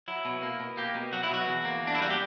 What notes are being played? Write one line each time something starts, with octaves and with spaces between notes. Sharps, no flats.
F#3 E4
B2
A#3
B2
A#3 G4
B2
F#3 F#4
E4
B2 F#4
E2
A#3
E2 D4
E4
G3 F#4
G4